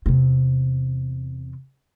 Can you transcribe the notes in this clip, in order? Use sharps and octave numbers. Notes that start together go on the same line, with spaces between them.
E2 C3